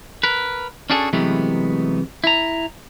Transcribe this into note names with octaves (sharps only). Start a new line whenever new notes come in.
A#4 B4
C#4 D4 F#4 G#4 A4
C3 E3 F#3 G#3 A3 B3
E4 A#5